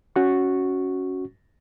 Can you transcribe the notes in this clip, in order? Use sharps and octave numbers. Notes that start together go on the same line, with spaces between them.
C#4 F#4 C#6